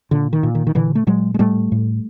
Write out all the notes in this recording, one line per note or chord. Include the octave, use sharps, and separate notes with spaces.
A#2 D3
D#3
A#2
D#3
D#3
A#2 D3 E3
A3
A#2 F#3 G#3
G#3
A2 G3 A3
A2